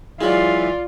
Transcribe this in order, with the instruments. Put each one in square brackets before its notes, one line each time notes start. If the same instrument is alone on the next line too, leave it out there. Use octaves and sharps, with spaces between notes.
[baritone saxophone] E3 [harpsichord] F#3 G#3 [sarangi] F4 [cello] D5 F5